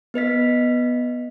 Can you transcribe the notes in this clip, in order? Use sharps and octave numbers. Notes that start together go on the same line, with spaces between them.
B3 B4 D#5 B6